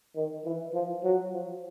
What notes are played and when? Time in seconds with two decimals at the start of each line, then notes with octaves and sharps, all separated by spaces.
0.16 D#3
0.45 E3
0.74 F3
1.03 F#3
1.33 F3